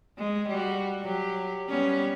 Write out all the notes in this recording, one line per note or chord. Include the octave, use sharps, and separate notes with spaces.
G#3
G3 F#4
F#3 G4
G3 B3 C#4